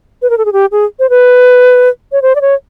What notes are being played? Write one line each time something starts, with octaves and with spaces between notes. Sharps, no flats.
B4
A#4
A4
G#4
G4
G#4
C5
B4
C#5
C5
D5
C#5